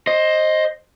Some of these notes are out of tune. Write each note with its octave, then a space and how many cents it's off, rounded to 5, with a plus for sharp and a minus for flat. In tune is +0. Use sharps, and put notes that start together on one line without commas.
C5 +15 D#5 +0